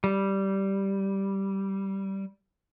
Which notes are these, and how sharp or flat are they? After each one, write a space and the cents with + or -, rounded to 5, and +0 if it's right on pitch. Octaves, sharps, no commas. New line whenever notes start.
G3 -10